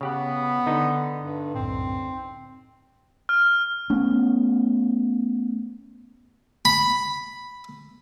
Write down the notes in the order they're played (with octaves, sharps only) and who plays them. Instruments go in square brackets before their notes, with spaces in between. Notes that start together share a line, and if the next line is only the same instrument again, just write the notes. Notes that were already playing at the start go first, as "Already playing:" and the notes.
[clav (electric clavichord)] C#3 G4 F#5 [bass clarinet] B3
[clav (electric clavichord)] D3 D#4 B4
[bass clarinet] G2
[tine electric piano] C2 F#2 A2 [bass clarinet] C4
[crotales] F6
[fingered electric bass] A3 B3 C#4
[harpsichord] B5